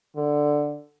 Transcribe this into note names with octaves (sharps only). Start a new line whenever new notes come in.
D3